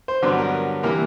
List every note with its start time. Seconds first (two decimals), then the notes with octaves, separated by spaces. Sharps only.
0.08 C5
0.22 G2 D3 F#3 B3 B4
0.38 A#4
0.83 C3 E3 G3 A#3 A#4